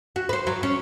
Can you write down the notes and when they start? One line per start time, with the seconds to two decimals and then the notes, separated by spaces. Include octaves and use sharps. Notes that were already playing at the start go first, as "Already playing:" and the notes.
0.16 F#4
0.29 B4 C5
0.47 F#3
0.63 C#4